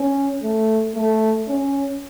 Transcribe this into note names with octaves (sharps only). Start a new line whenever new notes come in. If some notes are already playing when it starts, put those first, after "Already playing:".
Already playing: C#4
A3
A3
C#4